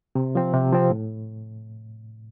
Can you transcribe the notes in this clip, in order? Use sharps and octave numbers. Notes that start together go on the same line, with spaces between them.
C3
F3 C4
C3
F3 C4
A2